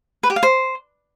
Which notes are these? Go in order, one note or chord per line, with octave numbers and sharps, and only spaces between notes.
B4
G4
F5
C5